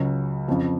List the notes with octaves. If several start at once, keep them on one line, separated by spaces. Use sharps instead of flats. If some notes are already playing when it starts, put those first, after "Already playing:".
Already playing: C#2 C#3 F#3 C#4
F2 C#3 F3